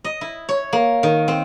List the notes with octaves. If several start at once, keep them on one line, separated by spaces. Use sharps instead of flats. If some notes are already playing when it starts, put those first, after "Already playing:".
D#5
E4
C#5
A#3
D#3
C4